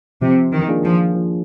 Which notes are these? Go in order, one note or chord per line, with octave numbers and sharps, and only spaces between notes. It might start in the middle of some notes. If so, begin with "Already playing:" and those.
C3 F3
D#3
A#3 D4 F4 G#4
F3
F3